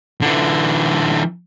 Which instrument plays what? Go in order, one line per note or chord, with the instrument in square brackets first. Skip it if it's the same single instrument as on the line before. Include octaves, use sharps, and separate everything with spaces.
[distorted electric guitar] D3 E3